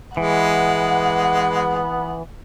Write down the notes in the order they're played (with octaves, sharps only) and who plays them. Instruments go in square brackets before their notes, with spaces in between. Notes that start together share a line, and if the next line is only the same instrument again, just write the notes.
[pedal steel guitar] E3 [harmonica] G#3 [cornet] B3 [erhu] F#5